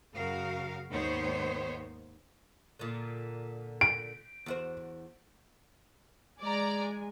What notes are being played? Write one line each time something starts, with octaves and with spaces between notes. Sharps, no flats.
F#2 C#3 F#4 A#4 F5
D#2 G#2 D#3 B3 C5 C#5
A#2 D3
D7
E2 F#4 C5
G#3 D5 G#5 A#5